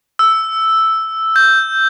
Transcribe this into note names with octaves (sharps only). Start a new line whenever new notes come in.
E6
G6